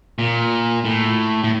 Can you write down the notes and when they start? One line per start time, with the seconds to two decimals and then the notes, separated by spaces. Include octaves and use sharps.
0.19 A#2
0.85 A2
1.44 A2